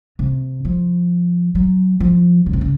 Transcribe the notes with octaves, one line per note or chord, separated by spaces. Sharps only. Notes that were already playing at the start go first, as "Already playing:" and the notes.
C3
F3
F#3
F3
C#3
C3
C#3